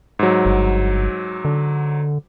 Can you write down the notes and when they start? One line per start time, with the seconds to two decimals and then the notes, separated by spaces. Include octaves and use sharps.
0.19 G#2 F#3
0.45 G1
1.45 D3